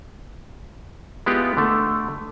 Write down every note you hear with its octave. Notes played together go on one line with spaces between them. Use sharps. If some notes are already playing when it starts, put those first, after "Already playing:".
G#3 B3 E4 F4 G4
D3 A3